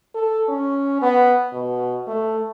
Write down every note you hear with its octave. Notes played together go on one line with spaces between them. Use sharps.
A4
C#4
B3
B2
A3